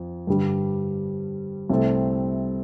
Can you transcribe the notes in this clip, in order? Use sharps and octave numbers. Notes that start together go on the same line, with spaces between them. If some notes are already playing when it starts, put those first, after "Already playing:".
Already playing: F2 F3
G2 D3 G3
C2 C3 A3 C4 A4